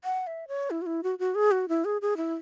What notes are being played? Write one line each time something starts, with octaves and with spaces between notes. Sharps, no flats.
F#5
E5
C#5
E4
F#4
E4
F#4
F#4
G#4
F#4
E4
G#4
G#4
E4